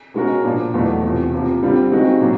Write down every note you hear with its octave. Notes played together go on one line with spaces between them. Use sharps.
B2 G#3 C#4 F#4 A#4
A#2 F3 A#3 D4
E2 B2 F#3 A3
E2 C3 F3
C3 F3 A#3
D3 G3 C4 F4
D#3 G#3 C4 D#4 F#4
A#2 F#3 A#3